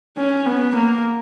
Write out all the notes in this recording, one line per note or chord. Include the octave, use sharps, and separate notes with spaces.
C#4
B3
A#3